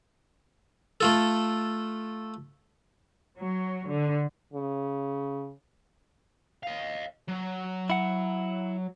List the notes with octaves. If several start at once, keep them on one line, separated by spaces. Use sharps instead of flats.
A3 F4 A4
F#3
D3
C#3
D#5 F5
F#3
E4 F#5